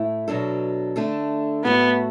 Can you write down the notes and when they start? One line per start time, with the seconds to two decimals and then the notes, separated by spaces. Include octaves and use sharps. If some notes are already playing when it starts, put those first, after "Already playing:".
Already playing: A2 A3 E4
0.28 B2 F#3 D4 A4
0.96 D3 A3 D4 A4
1.64 A2 A3 B3 F#4 A4